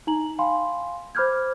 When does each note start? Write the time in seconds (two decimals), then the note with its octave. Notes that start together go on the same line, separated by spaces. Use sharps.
0.07 D#4 A#5 F#7
0.39 F5 G5 G#5 B5 C6
1.15 C5 B5 D6 F6 G6 G#6